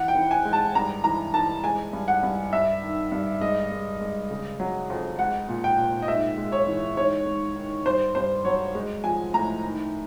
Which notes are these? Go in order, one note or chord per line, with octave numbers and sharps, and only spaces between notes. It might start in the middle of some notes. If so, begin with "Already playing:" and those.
Already playing: E3 F#5
G5
E3
G#5
G#3
A5
G2 A#5
E3 A#5
E3 A5
G#3 G#5
G2
F#5
G2
G2 E5
D#3
G2
G#3 D#5
G#3
G#3
C#3
F#3
F2
G#3 F#5
A#2
G5
A#2
D#5
G#2 E5
G#3
C#5
E3
G#2 C#5
G#2
D#3
G2 C5
G2 C5
F#3 C#5
G#3
F3 G#5
A2 A#5
D#3